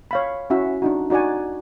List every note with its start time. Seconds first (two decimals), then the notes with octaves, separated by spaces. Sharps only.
0.11 C#5 F5 B5
0.50 C#4 E4 F#4 E5
0.82 D4 D#4 F#4
1.10 D#4 F#4 D5 F#5 G#5